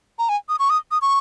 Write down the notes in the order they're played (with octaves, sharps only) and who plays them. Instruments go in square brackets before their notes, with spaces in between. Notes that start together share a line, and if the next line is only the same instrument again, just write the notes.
[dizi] A#5
G#5
D#6
C#6
D#6
D#6
C#6